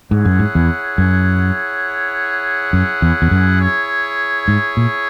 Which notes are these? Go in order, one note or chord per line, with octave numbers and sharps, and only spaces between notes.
G#2 E4 G#4 C#5 F#5
F#2
G#2
E2
F#2
F#2
E2
E2
F#2
E4 G#4 C#5
G#2
A#2